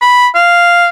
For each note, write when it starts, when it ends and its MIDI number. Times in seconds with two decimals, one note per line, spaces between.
0.01 0.27 83
0.35 0.89 77